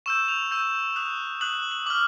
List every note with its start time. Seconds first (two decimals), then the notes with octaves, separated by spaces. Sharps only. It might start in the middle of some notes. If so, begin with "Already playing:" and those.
0.06 C#6 E6 G6 E7
0.28 F7
0.51 C#6 E6 G6
0.96 D#6 F#6
1.41 D#6 F#6 F#7
1.71 F#7
1.86 D6 F6 F#7